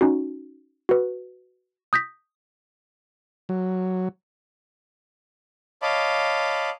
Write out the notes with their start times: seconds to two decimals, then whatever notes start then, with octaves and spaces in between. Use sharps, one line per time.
0.01 C#4 D#4 F#4
0.89 F#4 B4
1.93 D#6 G6 A#6 B6
3.49 F#3
5.82 C#5 D#5 F5 A5 B5 D6